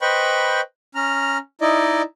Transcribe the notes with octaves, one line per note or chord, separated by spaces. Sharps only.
B4 C5 D#5 G5 B5 C#6
C#4 A#5 F6
D#4 E4 D5 D#5